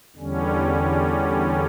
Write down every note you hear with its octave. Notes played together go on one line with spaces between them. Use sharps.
E2 D3 G3 C#4